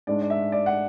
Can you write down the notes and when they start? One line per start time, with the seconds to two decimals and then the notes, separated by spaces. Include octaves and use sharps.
0.07 G#2 G#3 D4 D5
0.22 D5
0.30 E5
0.52 D5
0.66 F#5